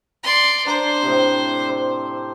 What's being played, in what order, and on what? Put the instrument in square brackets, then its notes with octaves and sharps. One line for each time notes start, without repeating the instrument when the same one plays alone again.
[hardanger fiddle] D5 C6
[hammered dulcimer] D4 A#5 [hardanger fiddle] C5
[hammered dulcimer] A2 C3
C5